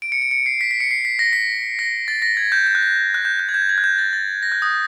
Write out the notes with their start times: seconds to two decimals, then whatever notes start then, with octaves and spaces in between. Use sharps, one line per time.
0.02 D7
0.12 C#7
0.22 D7
0.31 C#7
0.46 C7
0.61 B6
0.71 B6
0.80 C#7
0.91 C7
1.05 B6
1.19 A#6
1.33 B6
1.79 A#6
2.08 A6
2.22 A#6
2.37 G#6
2.52 G6
2.67 G6
2.75 F#6
2.83 G6
3.14 F#6
3.25 G6
3.39 F#6
3.49 G#6
3.54 G6
3.69 G#6
3.78 F#6
3.84 G6
3.98 A6
4.13 A6
4.42 A#6
4.52 F#6
4.62 D#6